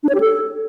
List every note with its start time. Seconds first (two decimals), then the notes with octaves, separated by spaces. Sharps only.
0.03 D4
0.09 C#5
0.15 G4
0.20 A4